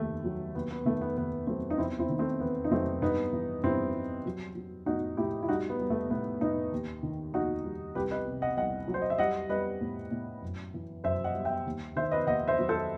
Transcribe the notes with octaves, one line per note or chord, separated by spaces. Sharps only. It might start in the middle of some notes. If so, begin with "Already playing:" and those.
Already playing: D#2 D#3 A3
F#3
D#2 B3
B3
D#3 A3
B3
D#2 B3
F#3 A3 C4
D#4
E2 C4 E4
C4 E4
D#3
A3 C4
E2 B3
D#4
F#3 A3 C4
G2 B3 D#4
E3
G2 C4 E4
G3
F#3
F#3
A2 D#4 F#4
A2 E4 G4
E4
G3 D#4 F#4
B3
G3
A3
A2 B3
A2 B3 D#4
D#2
D#3
D#2 D#4 F#4
G3
C2 G4 B4
B4 D#5
C3
D#5 F#5
C2 D#5 F#5
F#3
C5
D#5
E5
G3 D#5 F#5
G3 B4 D#5
A2
A2
F#2
E3
F#2 C5 E5
D#5 F#5
G3
E5 G5
D#2
D#3 C5 E5
B4 D#5
D#2 D#5 F#5
C5 E5
F#3
A4 C5